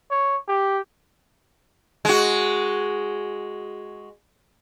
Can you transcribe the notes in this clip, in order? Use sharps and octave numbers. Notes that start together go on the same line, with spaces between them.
C#5
G4
G#3 F#4